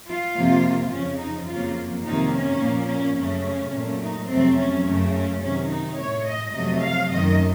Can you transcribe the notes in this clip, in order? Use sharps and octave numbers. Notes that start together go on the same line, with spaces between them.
F4
F2 C3 F3 A#3
F2 C#3 F3 C#4
D#4
F2 C#3 F#3 A#3 F4
F2 C3 D#3 A#3 D#4
C#4
A#2 F3 A#3
C#4
F#2 C#3 A3 C#4
A#2 F#3 A3
D#4
F2 C3 F#3 A3 C4
C#4
F#2 C#3 A3
C#4
C3 D#3 F#3 C#4
D#4
A2 A3 C#5
D#5
F2 C3 F#3 A3 D#5
F5
F#2 D#3 A3 D#5